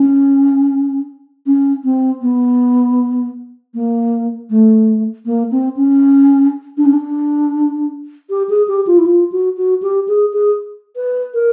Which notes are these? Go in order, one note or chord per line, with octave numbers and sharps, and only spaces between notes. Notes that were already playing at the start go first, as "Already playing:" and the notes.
Already playing: C#4
C#4
C4
B3
A#3
A3
A#3
C4
C#4
D4
C#4
D4
G4
G#4
G4
F4
E4
F4
F#4
F#4
G4
G#4
G#4
B4
A#4